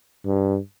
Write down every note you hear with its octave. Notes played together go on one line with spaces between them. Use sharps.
G2